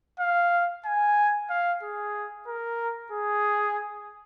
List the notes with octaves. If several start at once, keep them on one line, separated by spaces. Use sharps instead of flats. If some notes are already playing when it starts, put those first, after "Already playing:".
F5
G#5
F5
G#4
A#4
G#4